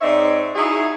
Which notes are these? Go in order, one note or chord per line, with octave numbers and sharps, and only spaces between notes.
G#2 C4 D#4 C#5 D5 E5
D#4 E4 F#4 G#4